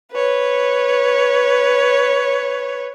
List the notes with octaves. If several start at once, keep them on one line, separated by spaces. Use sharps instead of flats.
B4 C#5